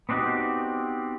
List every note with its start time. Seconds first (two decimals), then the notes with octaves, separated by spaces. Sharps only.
0.09 B3 C4 D4 D#4 F#4 G4